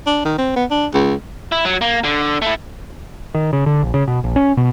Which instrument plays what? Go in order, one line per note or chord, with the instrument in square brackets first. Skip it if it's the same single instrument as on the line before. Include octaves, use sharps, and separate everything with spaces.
[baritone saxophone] D4
D#3
C4
B3
D4
C#2
[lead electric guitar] E4
F#3
A#3
D3
A3 E4
[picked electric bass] D#3
C#3
D3
A#1
C#3
B2
A#1
C#4
B2